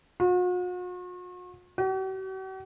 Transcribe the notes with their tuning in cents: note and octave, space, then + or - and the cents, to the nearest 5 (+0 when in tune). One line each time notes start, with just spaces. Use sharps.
F#4 -45
F#4 +45